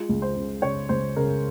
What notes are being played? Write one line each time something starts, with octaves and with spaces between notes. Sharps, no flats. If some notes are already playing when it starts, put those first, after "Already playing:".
Already playing: G#3 F4
C#2
C5
C#3
C#3 C#5
C#2 C5
C#3 A#4